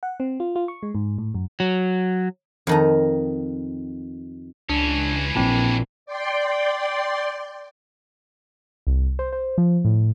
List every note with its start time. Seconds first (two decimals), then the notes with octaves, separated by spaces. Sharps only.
0.03 F#5
0.20 C4
0.40 F4
0.56 F4
0.68 C#6
0.83 G#3
0.95 G#2
1.18 A2
1.34 F#2
1.60 F#3
2.67 F2 D#3 D#4
4.69 C#2 E3 C#4 D4
5.35 A#1 A#2 C4 E4 A5
6.06 D5 G5 C6
8.87 C2
9.19 C5
9.32 C5
9.58 F3
9.85 A2